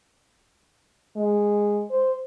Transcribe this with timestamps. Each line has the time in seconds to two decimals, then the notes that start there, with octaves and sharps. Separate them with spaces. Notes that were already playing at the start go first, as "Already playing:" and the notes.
1.16 G#3
1.90 C5